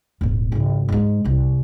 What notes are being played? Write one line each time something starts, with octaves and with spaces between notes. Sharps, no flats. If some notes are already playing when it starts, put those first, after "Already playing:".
D#1 G#1
G#1 C#2
G#2 G#3
D#1 C2